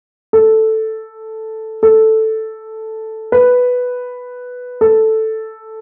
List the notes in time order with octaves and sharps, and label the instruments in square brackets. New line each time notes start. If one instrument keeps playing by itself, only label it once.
[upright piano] A4
A4
B4
A4